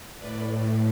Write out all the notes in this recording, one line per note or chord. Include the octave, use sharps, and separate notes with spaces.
A2 B4 D5